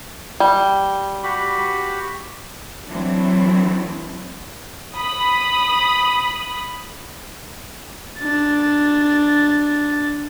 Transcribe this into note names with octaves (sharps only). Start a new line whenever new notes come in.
G3
F#4 G4 B5
E3 F#3 A3 C4 D4 E4
B5 D#6
D4 A6